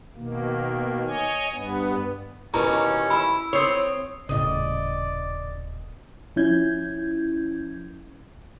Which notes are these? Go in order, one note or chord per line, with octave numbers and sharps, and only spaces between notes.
B2 D#3 A#3
C#5 D#5 G#5
G2 B3
D#2 B2 E3 C#4 A#5
E4 E5 B5
C4 C#5 D#6
D#1 A2 C#3 D5 D#5
F3 C#4 E4 G6 G#6